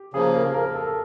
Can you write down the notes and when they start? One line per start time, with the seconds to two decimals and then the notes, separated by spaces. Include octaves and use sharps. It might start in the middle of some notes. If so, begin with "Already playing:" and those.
Already playing: G4
0.13 C#3 F3 A#3 G#4
0.35 A#4
0.54 A#4
0.75 A4